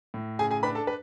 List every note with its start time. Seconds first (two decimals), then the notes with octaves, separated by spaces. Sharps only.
0.14 A2
0.39 C#3 G#4 G#5
0.51 G#4 G#5
0.63 D4 B4 B5
0.75 A4 A5
0.87 B4